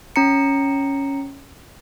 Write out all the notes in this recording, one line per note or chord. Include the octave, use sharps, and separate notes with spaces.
C#4 A#5 C#7